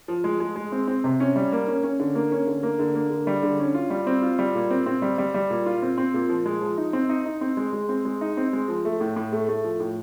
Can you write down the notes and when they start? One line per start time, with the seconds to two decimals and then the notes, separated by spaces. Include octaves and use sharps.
0.08 F3
0.24 G#3
0.40 G#3
0.56 G#3
0.72 C4
0.88 C4
1.04 C3
1.20 C#4
1.36 G3
1.52 A#3
1.68 C#4
1.83 C#4
2.00 D3
2.15 A#3
2.32 C#4
2.47 D3
2.63 A#3
2.79 D3
2.95 A#3
3.11 D3
3.27 G3
3.43 D3
3.59 C#4
3.75 F4
3.90 G3
4.07 C4
4.22 F4
4.39 G3
4.55 A#2
4.71 C4
4.86 C4
5.02 G3
5.18 G3
5.34 G3
5.50 A#2
5.66 F4
5.82 C4
5.98 C4
6.14 A#2
6.30 F3
6.46 G#3
6.61 F3
6.78 D#4
6.93 C4
7.09 D#4
7.26 D#4
7.41 C4
7.57 G#3
7.73 G#3
7.89 C4
8.05 G#3
8.21 D#4
8.37 C4
8.53 G#3
8.68 F3
8.85 A3
9.01 A2
9.16 A2
9.32 A3
9.49 A3
9.64 F3
9.80 A2